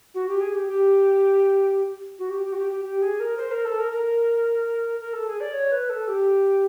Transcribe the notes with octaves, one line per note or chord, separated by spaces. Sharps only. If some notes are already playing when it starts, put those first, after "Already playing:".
F#4
G4
G#4
G4
G4
F#4
G4
G4
F#4
G4
G4
G4
G#4
A#4
C5
A#4
A4
A#4
A#4
A#4
A4
G#4
D5
C#5
B4
A4
G4